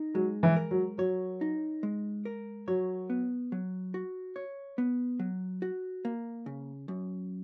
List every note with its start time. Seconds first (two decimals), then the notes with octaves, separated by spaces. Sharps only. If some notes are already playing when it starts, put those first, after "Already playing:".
Already playing: D#4
0.14 F#3 G#3
0.43 E3
0.56 A#4
0.71 F#3
0.98 F#3 C#5
1.41 D#4
1.83 G#3
2.25 A#4
2.67 F#3 C#5
3.10 B3
3.52 F#3
3.94 F#4
4.36 C#5
4.78 B3
5.19 F#3
5.62 F#4
6.05 A#3
6.46 C#3
6.88 F#2